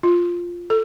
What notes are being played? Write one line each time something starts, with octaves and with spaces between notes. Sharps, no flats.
F4
A4